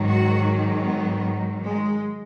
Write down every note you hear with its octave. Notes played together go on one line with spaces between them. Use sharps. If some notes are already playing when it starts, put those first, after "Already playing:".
Already playing: G#2 D#3 F#3
F#4
B3
G#3